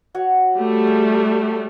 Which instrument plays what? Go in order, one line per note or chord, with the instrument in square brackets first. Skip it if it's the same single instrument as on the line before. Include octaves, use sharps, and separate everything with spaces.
[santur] F#4 C#5 F#5
[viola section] G3 A3
[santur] G#4